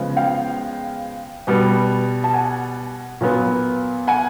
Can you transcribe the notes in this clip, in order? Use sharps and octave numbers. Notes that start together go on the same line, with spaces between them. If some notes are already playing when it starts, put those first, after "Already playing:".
Already playing: C#3 F3 G#3 B3
F5 G5
B2 G3 B3
A5
F#5 G#5
A#2 F#3 B3
F#5 G#5